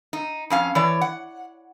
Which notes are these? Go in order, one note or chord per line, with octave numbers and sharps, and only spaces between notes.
D#4
F2 C#4 F5
E3 C#5 D5
F#5